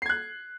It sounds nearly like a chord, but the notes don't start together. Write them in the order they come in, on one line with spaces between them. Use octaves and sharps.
C7 G#6 F#6